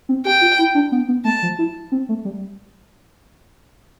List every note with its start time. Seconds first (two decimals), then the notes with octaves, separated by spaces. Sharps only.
0.09 C4
0.25 G4 G5
0.41 F4
0.59 E4
0.75 D4
0.92 B3
1.09 B3
1.25 A3 A5
1.43 F3
1.59 E4
1.92 C4
2.09 A3
2.25 G3